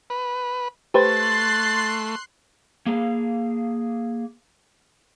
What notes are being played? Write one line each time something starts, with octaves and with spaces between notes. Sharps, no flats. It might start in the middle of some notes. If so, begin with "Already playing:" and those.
B4
A3 G4 B4 C5 C6 F#6 A6 C7
A#3 G#4 F5